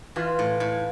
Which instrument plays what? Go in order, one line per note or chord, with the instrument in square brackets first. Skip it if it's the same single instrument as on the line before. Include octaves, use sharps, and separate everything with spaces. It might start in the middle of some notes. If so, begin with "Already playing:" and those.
[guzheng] E3 [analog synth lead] F4
[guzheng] A2
A2